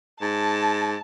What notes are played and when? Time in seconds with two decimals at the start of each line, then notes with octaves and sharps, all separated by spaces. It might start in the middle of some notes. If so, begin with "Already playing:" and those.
0.21 G#2 A5